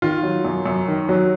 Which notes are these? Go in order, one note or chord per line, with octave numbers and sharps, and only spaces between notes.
D#3 F4
F#3
F#2
F#2
D#3
F#3